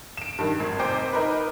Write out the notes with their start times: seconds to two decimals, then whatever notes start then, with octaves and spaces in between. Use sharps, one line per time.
0.17 D7 E7
0.38 G2 D#3
0.60 G#1
0.79 F1 C5 G5 D6 G6
1.13 D#4 A#4 B4